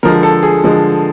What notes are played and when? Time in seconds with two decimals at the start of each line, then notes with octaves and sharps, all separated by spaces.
0.03 D3 F3 G#3 A#4
0.23 A4
0.43 G#4
0.64 D3 F3 G#3